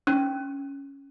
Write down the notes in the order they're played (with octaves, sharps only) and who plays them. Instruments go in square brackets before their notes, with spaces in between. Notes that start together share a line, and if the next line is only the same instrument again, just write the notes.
[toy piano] C#4